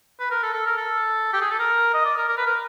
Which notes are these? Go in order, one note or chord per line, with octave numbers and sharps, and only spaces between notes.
B4
A#4
A4
A4
A#4
A4
G4
G#4
A4
A#4
D#5
D5
A#4
A#4
B4
A#4